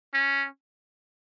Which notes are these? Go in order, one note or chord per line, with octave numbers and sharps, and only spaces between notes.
C#4